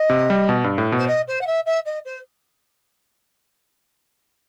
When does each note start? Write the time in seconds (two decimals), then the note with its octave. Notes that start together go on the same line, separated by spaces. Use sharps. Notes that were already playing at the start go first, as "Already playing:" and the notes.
Already playing: D#5
0.10 C3
0.30 G3
0.49 B2
0.64 G2
0.78 A2
0.92 B2
0.98 C5
1.08 D#5
1.28 C5
1.41 F#5
1.47 E5
1.66 E5
1.85 D#5
2.05 C5